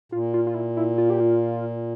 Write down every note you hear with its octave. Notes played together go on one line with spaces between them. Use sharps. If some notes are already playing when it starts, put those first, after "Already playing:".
A#2 F4
F4
F4
E4
E4
F4
G4
F4